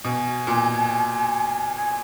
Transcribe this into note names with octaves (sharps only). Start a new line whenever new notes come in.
B2 G#5
A#2
G#5